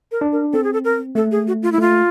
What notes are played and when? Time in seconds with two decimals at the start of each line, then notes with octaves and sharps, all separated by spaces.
0.12 A#4
0.21 D4
0.32 A#4
0.53 C4 A4
0.64 G#4
0.73 A4
0.85 A#4
1.15 A3 A4
1.31 G#4
1.47 F#4
1.63 F4
1.72 E4
1.78 A3 F4